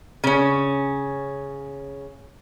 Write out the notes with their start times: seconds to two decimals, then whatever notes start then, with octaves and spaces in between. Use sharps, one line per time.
0.24 C#3 C#4